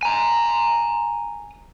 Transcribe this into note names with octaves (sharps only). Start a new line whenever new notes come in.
G#5 A#5